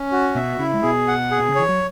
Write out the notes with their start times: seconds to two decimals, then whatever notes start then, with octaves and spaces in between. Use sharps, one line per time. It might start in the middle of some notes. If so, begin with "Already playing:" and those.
Already playing: C#4
0.12 F#4
0.35 B2 B3 E5
0.59 C#3 C#4 E4
0.74 G#3
0.83 B2 B3 G#4
1.08 F#5
1.31 G#4
1.40 B2
1.49 C#3
1.55 E3 C#5
1.69 F#3